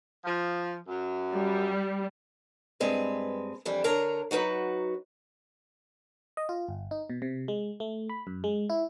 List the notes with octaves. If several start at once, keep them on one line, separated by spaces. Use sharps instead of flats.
F3
F#2
G3
G2 G#3 C4 B4
F2 E3 G3 D4
D3 D4 A#4 C#5 A#5
F#3 D#4 F#4 B4
D#5
F4
G1
D#4
B2
C3
G#3
A3
B5
F#2
G#3
E4